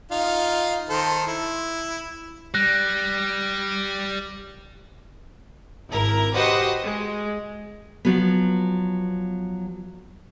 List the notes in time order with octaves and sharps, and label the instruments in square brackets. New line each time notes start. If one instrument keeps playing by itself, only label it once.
[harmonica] D#4 F4 F5
D#3 A4 C5
E4
[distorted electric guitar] G3 [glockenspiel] F#6 A#6
[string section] G#1 E4 A#4
F#4 G4 B4 C5 D#5 F#5
G#3
[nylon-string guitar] F3 F#3 B3